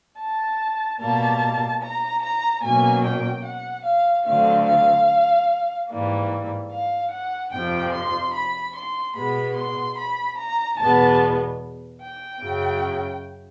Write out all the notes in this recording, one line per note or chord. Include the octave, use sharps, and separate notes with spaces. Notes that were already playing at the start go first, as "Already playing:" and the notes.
A5
B2 G3 A#3 A5
A#5
A#5
B2 F#3 A#3 C#4 G#5
G5
F#5
F5
D3 F#3 A3 C4 F5
F5
G#2 E3 G3 A#3
F5
F#5
F2 C3 F3 G5
C6
B5
C6
B2 G#3 B3 B5
C6
B5
A#5
E2 B2 G#3 B3 A5
G5
F#2 C#3 F#3